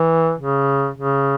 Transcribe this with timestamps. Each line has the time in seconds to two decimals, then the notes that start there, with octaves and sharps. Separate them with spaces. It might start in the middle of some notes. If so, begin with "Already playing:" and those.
Already playing: E3
0.38 C#3
0.96 C#3